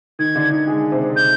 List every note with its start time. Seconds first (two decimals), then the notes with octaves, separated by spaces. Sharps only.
0.19 D#3 G#6
0.35 D3 D4
0.51 D#3 D#4
0.67 G#3 G#4
0.92 C3 C4
1.16 G6